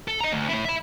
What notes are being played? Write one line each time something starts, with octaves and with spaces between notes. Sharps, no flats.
A4
D#5 A#5
D2
A3 E4
E5 B5